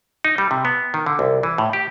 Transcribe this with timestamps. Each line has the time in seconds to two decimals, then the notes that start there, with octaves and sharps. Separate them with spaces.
0.25 D#4
0.38 G3
0.51 C3
0.65 B3
0.94 D#3
1.06 D3
1.19 C2
1.43 E3
1.58 A2
1.73 G4